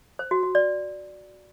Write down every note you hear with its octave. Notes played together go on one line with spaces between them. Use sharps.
C5
F#4
F#4
D5